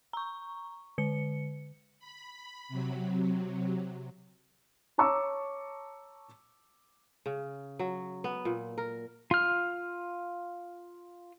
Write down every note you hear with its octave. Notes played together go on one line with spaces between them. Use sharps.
A#5 C#6
D3 C#7
B5
C3 F#3
C#5 A5 A#5 C#6 D6 E6
C#3
F#3
B3
A#2
A#4
F4 F6